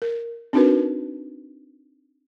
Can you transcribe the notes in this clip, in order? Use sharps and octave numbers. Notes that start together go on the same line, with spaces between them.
A#4
C4 D4 D#4 F#4 A#4 B4